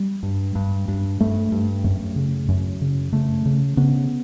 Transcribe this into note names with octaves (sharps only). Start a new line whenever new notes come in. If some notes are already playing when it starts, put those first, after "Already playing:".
Already playing: G3
G2
G2
G2
G2 A3
G2
F#2 A3
C#3
F#2
C#3
C#3 A3
C#3
C#3 B3